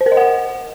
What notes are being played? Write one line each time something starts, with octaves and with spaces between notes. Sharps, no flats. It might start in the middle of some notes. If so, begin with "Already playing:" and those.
C5
A#4
D#5
F#5